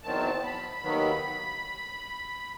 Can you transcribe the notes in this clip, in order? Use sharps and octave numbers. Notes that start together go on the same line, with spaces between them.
E2 D#3 F#3 C4 A5
B5
D#2 D#3 F#3 B3